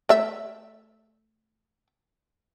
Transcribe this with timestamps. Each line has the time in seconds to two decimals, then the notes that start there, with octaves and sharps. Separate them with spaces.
0.09 A3 E5